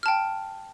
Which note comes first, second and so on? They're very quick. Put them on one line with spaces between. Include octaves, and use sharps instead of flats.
F6 A5 G5